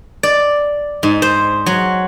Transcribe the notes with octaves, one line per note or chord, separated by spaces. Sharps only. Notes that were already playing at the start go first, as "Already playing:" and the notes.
D5
G#2
C5
F#3